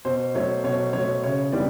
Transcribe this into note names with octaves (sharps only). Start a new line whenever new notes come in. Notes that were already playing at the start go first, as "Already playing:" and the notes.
B2 C5
F#3 A3 C#5
B2 C#5
F#3 A3 C#5
C#3 C#5
E3 G3 B3 D4 D5